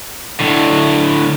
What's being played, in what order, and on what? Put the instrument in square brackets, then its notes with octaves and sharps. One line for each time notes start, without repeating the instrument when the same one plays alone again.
[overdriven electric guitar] D2 A2